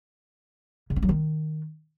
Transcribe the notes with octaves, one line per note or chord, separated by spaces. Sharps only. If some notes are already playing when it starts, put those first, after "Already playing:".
C#3
C#4
F#3
D#3